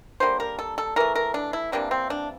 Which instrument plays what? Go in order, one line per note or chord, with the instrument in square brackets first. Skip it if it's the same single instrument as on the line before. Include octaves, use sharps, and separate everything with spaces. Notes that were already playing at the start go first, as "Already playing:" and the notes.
[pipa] D3 G3 A#3 C5
A#4
A4
A4
E3 A3 A#4
A#4
D4
E4
C3 E3 G3 A#3 D4
C4
D4